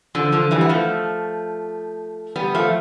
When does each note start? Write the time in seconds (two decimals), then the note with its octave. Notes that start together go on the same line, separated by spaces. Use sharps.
0.15 D3 F3
0.32 D3 F3
0.51 E3 G3
0.61 B3
0.69 F3 A3
2.36 G3 B3
2.55 F3 A3